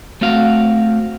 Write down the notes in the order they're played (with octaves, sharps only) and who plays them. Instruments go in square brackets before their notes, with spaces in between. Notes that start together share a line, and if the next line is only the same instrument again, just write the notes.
[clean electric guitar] A3 C4 F#4 F5